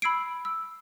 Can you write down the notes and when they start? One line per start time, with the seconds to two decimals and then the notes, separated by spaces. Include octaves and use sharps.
0.02 B5 E6 G#6 C7 D7
0.45 E6